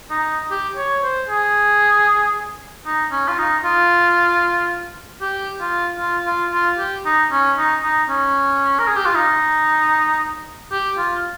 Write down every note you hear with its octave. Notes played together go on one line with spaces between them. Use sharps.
D#4
G4
C#5
C5
G#4
D#4
C#4
F4
D#4
F4
G4
F4
F4
F4
F4
G4
D#4
C#4
D#4
D#4
C#4
A#4
G#4
G4
F4
D#4
G4
F4